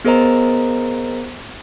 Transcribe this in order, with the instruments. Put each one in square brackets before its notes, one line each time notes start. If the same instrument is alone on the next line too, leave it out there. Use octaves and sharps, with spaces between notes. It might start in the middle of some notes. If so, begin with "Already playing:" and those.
[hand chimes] B3 G#4 A#4 C5 D#5 A#5